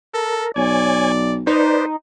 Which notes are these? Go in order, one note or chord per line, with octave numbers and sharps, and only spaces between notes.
A4 A#4
B1 C#5 D5 G#5
D#4 B4 C5 D5